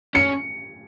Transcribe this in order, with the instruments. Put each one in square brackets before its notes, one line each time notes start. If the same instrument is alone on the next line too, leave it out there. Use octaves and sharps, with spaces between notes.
[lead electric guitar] C#4 [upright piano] C#7